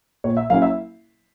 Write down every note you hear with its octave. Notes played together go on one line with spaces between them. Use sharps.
A#2 C#5
E5
F#3 A#3 C#4 E4 F5
E5